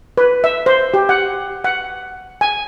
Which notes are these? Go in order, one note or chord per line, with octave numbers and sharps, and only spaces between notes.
B4
E5
C5
G4
F#5
F#5
G#5